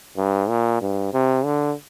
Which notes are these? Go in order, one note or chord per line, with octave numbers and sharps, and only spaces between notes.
G2
A#2
G2
C3
D3